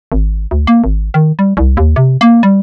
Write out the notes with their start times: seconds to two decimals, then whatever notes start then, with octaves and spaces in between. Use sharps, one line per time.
0.12 G#1
0.51 D2
0.67 A#3
0.84 G#1
1.14 D#3
1.39 G3
1.57 C2
1.77 D#2
1.96 C3
2.21 A#3
2.43 G3